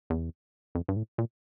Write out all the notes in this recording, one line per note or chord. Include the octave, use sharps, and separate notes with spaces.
E2
F2
G2
A2
A#2